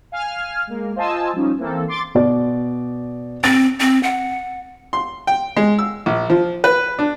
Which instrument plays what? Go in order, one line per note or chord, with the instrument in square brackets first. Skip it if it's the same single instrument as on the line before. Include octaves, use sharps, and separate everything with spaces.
[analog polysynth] F5 G#5 F6
G#3 A#3
F4 C5 D#5 G#5 A5 E6
F3 G3 C#4 D#4
E3 A#3 C4 A4
C6 D6 A6
[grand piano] B2 D5
[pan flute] C4 [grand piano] A6
[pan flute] C4
F#5
[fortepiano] C6
G5
G#3
E6
A#1
F3
B4
D4